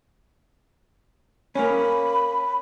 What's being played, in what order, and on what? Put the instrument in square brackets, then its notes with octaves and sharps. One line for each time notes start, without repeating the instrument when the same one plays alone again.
[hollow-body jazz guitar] A#3 C#4 [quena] B5